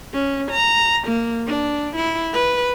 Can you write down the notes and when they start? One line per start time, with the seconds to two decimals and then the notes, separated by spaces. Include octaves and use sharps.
0.13 C#4
0.51 A#5
1.07 A#3
1.47 D4
1.96 E4
2.33 B4